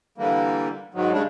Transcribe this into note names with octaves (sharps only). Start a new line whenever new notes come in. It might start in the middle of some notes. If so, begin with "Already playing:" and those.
D3 E3 G3 A#3
G#2 D#3 F#3
C#3 G3 G#3 D4